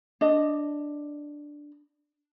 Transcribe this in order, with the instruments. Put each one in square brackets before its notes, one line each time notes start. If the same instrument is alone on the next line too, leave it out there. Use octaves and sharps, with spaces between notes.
[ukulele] D4 D#5